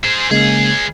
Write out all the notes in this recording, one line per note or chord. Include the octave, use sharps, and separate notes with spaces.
G#4 C5
C#2 C#3 G#3 A#3 G#4